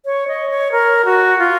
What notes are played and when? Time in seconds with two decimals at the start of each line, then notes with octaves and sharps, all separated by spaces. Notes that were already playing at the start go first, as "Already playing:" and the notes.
0.05 C#5
0.28 D#5
0.50 C#5
0.72 A#4
1.05 F#4
1.39 F4